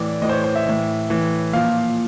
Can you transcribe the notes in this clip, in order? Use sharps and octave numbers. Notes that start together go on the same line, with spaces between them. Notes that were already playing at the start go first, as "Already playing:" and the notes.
Already playing: A2 E3 D5
A2 E3 D#5
C5
C#5
C5
E5
A2 E3
A2 E3
A#2 F3 F5